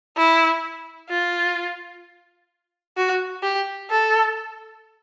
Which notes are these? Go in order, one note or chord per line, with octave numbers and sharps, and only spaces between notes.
E4
F4
F#4
G4
A4